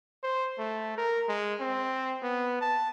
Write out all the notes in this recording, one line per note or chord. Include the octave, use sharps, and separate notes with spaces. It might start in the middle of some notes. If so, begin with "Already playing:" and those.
C5
A3
A#4
G#3
C4
B3
A5